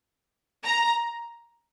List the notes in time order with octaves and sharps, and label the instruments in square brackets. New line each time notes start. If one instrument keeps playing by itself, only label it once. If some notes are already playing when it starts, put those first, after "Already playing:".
[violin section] A#5